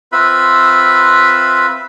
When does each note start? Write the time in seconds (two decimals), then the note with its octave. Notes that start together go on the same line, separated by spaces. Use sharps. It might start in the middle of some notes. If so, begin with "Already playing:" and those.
0.12 C4 F4 B4 E5 B5